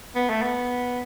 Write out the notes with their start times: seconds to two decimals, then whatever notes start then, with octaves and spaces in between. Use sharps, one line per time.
0.15 B3
0.29 A3
0.42 B3